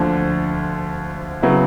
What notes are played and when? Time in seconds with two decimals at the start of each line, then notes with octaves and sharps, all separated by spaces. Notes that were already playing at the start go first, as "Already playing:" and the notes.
Already playing: D2 D3 F3
1.42 C#3 F#3 B3 E4